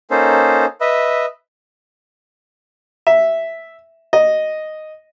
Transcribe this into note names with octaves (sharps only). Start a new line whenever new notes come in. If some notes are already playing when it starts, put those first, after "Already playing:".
A#3 C#4 D#4 A4 C5
B4 D#5 E5
E5
D#5